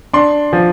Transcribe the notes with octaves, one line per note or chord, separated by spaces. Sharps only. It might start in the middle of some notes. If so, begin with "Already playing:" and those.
D4 C6
F3